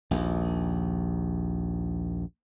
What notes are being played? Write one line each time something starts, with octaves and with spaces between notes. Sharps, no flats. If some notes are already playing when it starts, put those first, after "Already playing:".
A#1 D#2